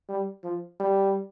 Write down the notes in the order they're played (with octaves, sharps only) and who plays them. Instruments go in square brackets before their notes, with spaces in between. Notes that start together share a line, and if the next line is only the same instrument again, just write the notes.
[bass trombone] G3
F3
G3